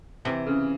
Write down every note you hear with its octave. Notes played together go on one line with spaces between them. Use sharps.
C3 E3
C#3